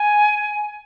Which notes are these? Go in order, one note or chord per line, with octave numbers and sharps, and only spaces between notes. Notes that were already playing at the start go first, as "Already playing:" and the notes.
Already playing: G#5